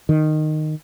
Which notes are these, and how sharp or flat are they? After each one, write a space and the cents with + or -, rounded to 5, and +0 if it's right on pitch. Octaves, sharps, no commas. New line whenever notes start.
D#3 -15